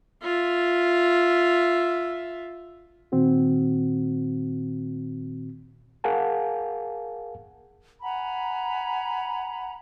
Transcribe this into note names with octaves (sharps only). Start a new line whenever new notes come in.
F4 E5
A#2 D#3 C4 F#4
G#4 A#4 F5 F#5 G#5 A5
F#5 G#5 A#5 B5